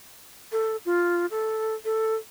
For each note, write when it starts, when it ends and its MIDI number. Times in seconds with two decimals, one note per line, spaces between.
0.52 0.76 69
0.85 1.26 65
1.31 1.74 69
1.85 2.15 69